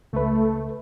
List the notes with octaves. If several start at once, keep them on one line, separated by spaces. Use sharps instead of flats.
C#2 A3 B4